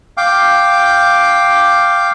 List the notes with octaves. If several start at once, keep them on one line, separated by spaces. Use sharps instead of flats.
F5 G5 D6